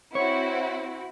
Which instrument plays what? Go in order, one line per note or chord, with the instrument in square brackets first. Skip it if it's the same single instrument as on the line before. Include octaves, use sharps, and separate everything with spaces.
[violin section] C4 E4 F#4 [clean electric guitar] C#5